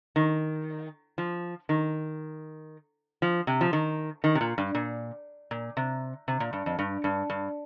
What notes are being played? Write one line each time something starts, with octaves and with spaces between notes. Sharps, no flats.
D#3
F3
D#3
F3
C3
F3
D#3
D#3
C3
A#2
G2
A#2
A#2
C3
C3
A#2
G2
F2
G2
G2
G2